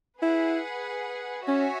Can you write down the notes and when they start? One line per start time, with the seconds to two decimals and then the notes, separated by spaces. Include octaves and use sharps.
0.22 E4 G#4 B4 F#5
1.47 C#4 F#4 C#5 E5 G#5